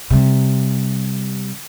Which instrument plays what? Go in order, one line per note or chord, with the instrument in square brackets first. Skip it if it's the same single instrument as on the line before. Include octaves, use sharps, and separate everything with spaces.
[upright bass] C3 G3